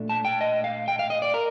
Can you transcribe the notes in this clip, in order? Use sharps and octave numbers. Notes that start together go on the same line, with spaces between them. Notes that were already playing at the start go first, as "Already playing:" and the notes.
Already playing: A#2 A3 D4
A5
G5
D#5
F5
G5
F5
D#5
D5
A#4